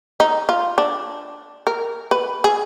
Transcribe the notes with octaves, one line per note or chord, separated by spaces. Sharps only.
D#4
F4
D4
A#4
B4
G#4